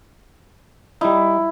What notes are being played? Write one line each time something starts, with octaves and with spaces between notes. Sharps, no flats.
G3 D#4 E4